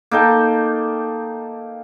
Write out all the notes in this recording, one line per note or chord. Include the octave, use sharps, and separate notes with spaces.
A#3 D#4 A4 G5